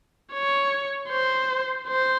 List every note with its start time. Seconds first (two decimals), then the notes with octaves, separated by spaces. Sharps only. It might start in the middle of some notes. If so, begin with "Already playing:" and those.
0.34 C#5
1.09 C5
1.88 C5